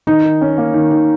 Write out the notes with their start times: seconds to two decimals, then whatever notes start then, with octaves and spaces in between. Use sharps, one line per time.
0.07 D#3 D#4
0.24 D#3
0.41 C#4
0.58 A#3
0.74 D#3
0.92 D#3